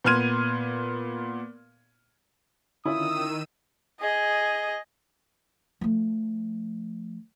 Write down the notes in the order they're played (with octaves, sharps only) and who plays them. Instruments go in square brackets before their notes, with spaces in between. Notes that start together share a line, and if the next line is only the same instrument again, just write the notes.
[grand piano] A#2 B3 C6 F6 G#6 D#7
[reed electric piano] D3 C#4 F4 [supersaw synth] D#3 E6 D#7 [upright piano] E4 [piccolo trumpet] D#6
[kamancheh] G#4 D#5
[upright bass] F3 A3